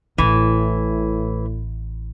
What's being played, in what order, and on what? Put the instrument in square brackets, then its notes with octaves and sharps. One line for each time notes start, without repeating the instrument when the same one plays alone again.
[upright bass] A1 [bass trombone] A2 [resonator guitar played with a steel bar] E3